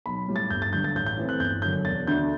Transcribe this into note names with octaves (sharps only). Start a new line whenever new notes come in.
B1 B5
A2 G3
A6
G1 G6
A6
G2 D3 G3 G6
A6
A1 G6
G6
A2 E3 A3 C4
F#6
G1 G6
F#2 D3 G6
E1 A6
D2 D3 A3 D4 G6